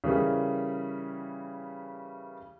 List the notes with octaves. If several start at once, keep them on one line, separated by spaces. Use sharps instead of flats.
C#3 E3 G3 A#4